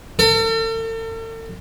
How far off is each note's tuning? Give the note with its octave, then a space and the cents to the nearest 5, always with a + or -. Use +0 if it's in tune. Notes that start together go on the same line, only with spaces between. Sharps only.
A4 +45